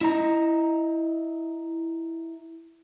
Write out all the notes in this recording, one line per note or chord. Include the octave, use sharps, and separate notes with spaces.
E4 D#5 A#5